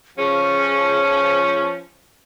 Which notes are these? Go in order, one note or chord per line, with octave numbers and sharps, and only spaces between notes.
F3 C#4 G#4